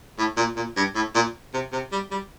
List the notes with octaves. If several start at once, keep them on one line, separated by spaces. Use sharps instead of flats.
A2
A#2
A#2
G2
A2
A#2
C3
C3
G3
G3